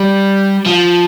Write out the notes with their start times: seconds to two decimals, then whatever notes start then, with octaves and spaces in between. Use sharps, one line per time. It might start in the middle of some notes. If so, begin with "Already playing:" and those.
Already playing: G3
0.66 F3